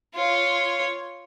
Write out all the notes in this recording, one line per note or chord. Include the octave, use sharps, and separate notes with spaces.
F4 C#5